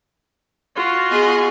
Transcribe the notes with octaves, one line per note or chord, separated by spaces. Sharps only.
F4 F#4
B3 G#4 D#5